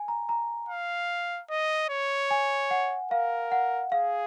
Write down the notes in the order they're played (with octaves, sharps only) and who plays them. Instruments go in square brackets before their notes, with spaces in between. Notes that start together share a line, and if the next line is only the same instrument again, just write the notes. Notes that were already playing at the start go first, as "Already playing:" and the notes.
Already playing: [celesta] G#5
A#5
A#5
[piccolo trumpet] F5
D#5
C#5
[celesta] G#5
F#5
[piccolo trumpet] A#4 [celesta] F5
[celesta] F#5
[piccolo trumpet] G#4 [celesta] F5